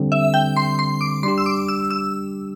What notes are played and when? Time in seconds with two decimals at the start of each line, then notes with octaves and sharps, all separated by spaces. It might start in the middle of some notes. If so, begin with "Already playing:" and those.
Already playing: D3 G3 C4
0.12 E5
0.34 G5
0.56 C6
0.79 C6
1.01 D6
1.23 G3 D4 G4 C6
1.38 E6
1.46 D6
1.68 E6
1.90 E6